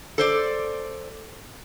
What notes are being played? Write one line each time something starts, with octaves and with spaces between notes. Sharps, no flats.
A4 C5 D5